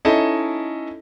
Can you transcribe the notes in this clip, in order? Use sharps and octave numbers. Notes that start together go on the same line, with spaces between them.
C#4 D#4 E4 A4 D#5